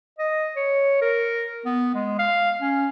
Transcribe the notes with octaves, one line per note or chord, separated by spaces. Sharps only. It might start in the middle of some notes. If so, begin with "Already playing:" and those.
D#5
C#5
A#4
B3
G#3
F5
C#4